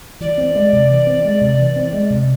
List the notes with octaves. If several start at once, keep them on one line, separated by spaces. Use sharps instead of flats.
E3 D5
C4
G#3
C3
E3
C4
G#3
C3
E3
C4
G#3
C3